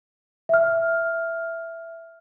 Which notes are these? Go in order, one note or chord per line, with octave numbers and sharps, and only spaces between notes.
E5 F6